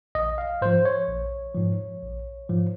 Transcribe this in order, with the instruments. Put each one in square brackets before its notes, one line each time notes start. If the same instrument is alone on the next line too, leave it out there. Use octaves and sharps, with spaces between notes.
[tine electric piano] A#1 D#5
F5
G#2 F3 C5
C#5
A#1
G#2 F3
A#1
G#2 F3